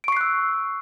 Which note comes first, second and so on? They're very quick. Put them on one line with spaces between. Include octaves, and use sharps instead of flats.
D7 C#6 C7 F#6 E6